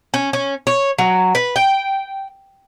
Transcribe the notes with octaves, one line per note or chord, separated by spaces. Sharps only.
C#4
C#4
C#5
F#3
B4
G5